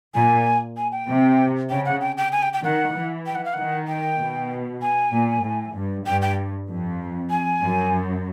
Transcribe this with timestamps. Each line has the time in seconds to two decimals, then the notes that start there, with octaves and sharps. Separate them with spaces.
0.14 A#2 G#5
0.77 G#5
0.92 G5
1.08 C3
1.70 C#3 G5
1.85 F#5
2.01 G5
2.17 G5
2.32 G#5
2.42 G5
2.53 G5
2.63 D#3 F#5
2.94 E3
3.26 G5
3.35 F#5
3.45 F5
3.54 D#3 F#5
3.88 G5
4.19 B2
4.82 G#5
5.12 A#2
5.43 A2
5.75 G2
6.06 G2 G5
6.22 G5
6.69 F2
7.30 G#5
7.62 F#2